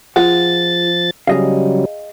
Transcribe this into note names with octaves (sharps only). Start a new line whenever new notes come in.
F3 F4 G#4 F#5 A6
C#3 F#3 G3 G#4 D#5 F5